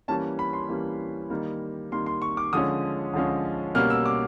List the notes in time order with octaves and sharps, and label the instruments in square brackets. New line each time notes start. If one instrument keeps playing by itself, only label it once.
[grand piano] E3 G3 A#3 C#4 A5
B5
C6
E3 G3 A#3 C#4
D#3 G3 A#3
D#3 G3 A#3 C6
C6
C#6
D6
D3 F3 G#3 C#4 D#6
D3 F3 G#3 C#4
B2 G3 A#3 C#4 F6
E6
D6